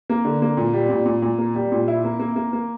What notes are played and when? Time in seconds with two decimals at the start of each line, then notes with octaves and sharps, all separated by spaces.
0.10 A#3
0.25 D3
0.42 A#3
0.57 A#2
0.73 G3
0.90 A#2
1.06 A#2
1.22 A#2
1.38 A#3
1.55 G3
1.72 A#2
1.88 E4
2.04 A#3
2.19 A#3
2.36 A#3
2.53 A#3